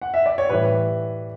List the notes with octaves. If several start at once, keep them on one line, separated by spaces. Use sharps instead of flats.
F#5
E5
D5
C#5
A2 E3 G3 B4